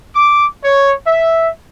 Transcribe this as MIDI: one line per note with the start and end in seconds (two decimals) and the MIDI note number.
0.14 0.46 86
0.65 0.93 73
1.06 1.50 76